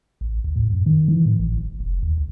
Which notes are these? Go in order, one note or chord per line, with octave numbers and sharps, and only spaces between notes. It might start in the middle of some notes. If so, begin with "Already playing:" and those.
A1
D2
A2
F#2
D#3
E3
A2
A1
D1
F1
D#2
C#2